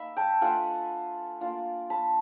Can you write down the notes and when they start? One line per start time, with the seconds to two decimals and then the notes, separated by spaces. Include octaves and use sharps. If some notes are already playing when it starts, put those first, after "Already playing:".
Already playing: A#3 D#4 E5 B5
0.17 G5 A5
0.41 A3 D4 F4 F#5 G#5
1.41 A#3 D4 F4
1.90 A5 B5